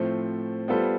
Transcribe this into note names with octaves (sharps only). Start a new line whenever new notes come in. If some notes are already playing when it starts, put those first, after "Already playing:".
Already playing: A2 F3 A3 C4
G3 B3 F4 A4 C5